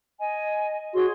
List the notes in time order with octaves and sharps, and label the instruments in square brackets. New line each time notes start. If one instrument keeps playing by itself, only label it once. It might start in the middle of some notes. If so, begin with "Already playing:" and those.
[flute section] D#5 G#5
[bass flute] F#4 [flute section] G#4 C#5 C6